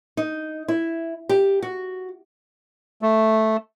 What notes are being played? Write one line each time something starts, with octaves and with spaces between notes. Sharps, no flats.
D#4
E4
G4
F#4
A3